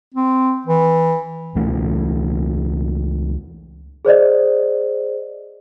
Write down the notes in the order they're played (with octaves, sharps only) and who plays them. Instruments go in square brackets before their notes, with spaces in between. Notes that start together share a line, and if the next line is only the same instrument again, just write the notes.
[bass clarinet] C4
E3
[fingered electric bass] C#2 E3 A3 C#4
[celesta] G#4 C5 D5 D#5